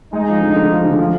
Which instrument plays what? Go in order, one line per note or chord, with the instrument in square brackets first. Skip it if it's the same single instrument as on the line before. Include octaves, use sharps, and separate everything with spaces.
[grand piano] G#3 [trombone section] D#4
[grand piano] F3
D3
D3
F3
D3
F3